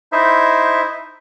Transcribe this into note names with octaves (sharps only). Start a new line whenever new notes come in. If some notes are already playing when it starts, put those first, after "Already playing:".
D#4 E4 C5 E5